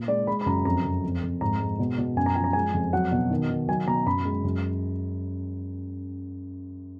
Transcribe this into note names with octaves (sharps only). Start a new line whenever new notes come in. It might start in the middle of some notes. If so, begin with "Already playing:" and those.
Already playing: A#2
G#3 D5
G#3 B5
B5
F#2 A#5
F2 A#5
F2
F2
F2
G#2 A#5
G#3
B2
B2
F#2 G#5
A#5
F3 G#5
A#5
G#3 G#5
F2
F#3 F#5
B2
D#3
D#3
F#3 G#5
B2 A#5
F#2 B5
G#3
F#2